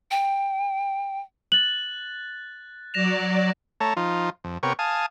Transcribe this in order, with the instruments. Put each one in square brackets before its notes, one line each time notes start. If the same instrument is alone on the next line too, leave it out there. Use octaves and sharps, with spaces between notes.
[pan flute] G5
[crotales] F#6 A6 [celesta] F#7
[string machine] F#3 D5 [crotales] A#6 E7 F7
[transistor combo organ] A3 C#5 A5 A#5
F3 D#4 F4
F2
C3 B3 A#4 C#5 G5 C#6
F5 G#5 A5 D#6